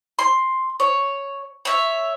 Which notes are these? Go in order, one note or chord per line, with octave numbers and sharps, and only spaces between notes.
C6
C#5
C#5 E5